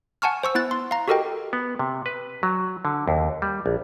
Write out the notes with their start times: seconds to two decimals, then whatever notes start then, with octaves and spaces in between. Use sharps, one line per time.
0.22 F#5 G#5 A5 C#6 F6
0.43 C5 C#6 E6
0.55 B3 E4 F#6 A6
0.71 C6
0.91 F5 A#5
1.08 F#4 G4 A4 A#4 D#5 G5
1.53 B3
1.79 C3
2.06 B4
2.43 F#3
2.85 D3
3.08 D#2
3.42 G3
3.66 A#1